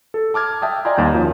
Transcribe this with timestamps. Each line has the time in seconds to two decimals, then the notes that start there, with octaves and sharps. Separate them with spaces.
0.14 A4
0.34 A5 D6 F6 G#6
0.62 E5 G5 A5 D#6
0.85 D5 D#5 G5 G#5 A#5 C6
0.97 D#2 G3 G6
1.14 F#2 F3